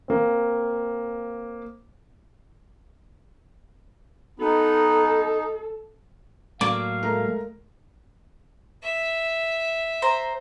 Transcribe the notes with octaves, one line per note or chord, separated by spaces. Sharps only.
A#3 C4
B3 D#4 A4
A2 F#3 A#3 D5 F5
G#3 A3 A#4
E5
C5 A#5